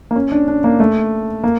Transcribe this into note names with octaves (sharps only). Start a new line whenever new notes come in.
A#3
C#4
D4
D4
A#3
A3
A#3